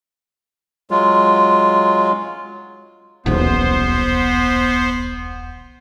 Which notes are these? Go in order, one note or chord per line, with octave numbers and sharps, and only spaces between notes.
F#3 G#3 F4
D#1 B1 E2 B3 C5